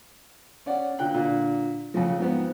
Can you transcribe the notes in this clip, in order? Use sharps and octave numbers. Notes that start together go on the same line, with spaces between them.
C#4 D5 F#5
A#2 D3 G5 F#6
A#2 D3
F2 C#3 F3
G#2 F3 B3 C4